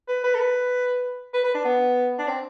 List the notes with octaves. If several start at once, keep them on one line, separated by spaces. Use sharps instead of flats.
B4
B4
A4
B4
B4
B4
D4
B3
D4
C4